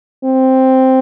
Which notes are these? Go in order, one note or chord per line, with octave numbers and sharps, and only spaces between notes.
C4